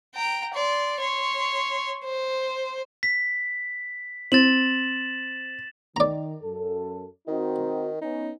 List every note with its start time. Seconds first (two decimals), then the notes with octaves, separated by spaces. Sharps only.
0.15 G5 A#5
0.54 D5 C6
1.01 C#5 C6
2.04 C5
3.03 B6
4.32 C4 A6 E7 F#7
5.96 D#3 D5 A#5
6.42 F#2 A4
7.28 D#3 C4 D#4 F#4
8.02 B3 C#4 D#4